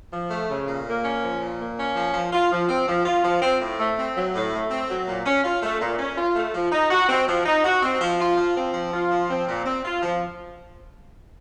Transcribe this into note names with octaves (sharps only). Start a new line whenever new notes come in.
F3
A3
C#3
A#2
A#3
C#4
F3
A#2
A#3
C#4
F3
F3
F4
F3
C4
F3
F4
F3
C4
A2
A3
C4
F#3
A2
A3
C4
F#3
A#2
C#4
F4
A3
A#2
C#4
F4
A3
F3
D#4
F#4
C4
F3
D#4
F#4
C4
F3
F4
F3
C4
F3
F4
F3
C4
A#2
C4
F4
F3